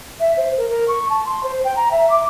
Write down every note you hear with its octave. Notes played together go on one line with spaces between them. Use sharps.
E5
C5
A#4
A#4
C#6
A5
C6
C5
G5
A#5
E5
D6